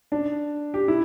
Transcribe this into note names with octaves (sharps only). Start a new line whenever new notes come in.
D4
G4
E4